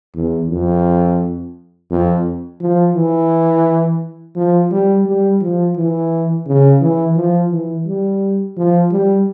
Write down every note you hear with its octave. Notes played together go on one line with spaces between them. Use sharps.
E2
F2
F2
F3
E3
F3
G3
G3
F3
E3
C#3
E3
F3
E3
G3
F3
G3